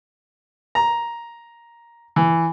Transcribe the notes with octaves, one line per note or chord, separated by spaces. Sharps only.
A#5
E3